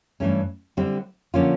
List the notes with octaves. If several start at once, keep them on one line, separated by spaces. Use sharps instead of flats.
G2 E3 A3 C#4
D3 G3 C4 E4
D3 F3 A#3 C#4 F4